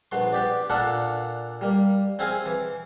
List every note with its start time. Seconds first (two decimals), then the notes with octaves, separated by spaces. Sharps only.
0.12 A#1 B3 C6
0.33 B3 G4 D5
0.70 A#2 A#3 D4 A4 F#5
1.61 G3 A#3
2.19 C4 E4 G#4 F5 G#5
2.46 E3